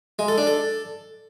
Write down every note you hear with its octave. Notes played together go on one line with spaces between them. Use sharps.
G#3
A4
D4
A4